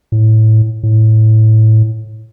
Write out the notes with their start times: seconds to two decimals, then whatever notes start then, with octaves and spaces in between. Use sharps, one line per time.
0.12 A2
0.83 A2